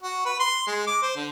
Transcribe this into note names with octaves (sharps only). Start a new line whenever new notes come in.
F#4
B4
C6
G#3
D6
C5
D3